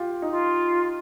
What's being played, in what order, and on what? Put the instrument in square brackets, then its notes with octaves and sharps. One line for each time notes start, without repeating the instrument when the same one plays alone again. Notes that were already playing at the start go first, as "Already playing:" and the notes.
Already playing: [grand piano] F4 G4
D#4
[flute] F4